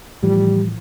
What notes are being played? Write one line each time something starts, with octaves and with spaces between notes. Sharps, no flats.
A2 E3 F3 G3